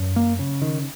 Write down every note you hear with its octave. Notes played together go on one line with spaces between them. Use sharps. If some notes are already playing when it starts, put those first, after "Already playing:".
Already playing: F#2
A#3
C#3
D#3